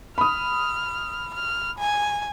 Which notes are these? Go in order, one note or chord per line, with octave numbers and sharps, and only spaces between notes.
B5 D#6 F6
F6
G#5